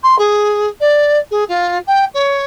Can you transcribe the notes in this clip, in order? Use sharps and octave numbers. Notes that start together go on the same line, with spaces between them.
C6
G#4
D5
G#4
F4
G5
C#5